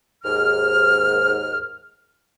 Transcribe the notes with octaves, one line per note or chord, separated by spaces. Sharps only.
D#2 G#2 F6